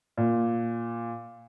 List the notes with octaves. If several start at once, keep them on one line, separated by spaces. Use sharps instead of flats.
A#2